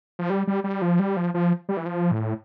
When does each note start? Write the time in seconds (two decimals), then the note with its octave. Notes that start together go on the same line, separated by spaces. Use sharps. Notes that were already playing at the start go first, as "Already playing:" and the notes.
0.19 F3
0.30 G3
0.47 G3
0.64 G3
0.82 F3
0.99 G3
1.17 F3
1.34 F3
1.69 G3
1.77 E3
1.86 F3
2.11 A2